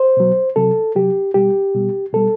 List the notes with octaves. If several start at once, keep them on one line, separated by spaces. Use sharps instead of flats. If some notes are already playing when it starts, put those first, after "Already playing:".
Already playing: C5
B2 F#3
C3 F#3 A4
C3 F#3 G4
B2 G3 G4
B2 G3
B2 G3 A4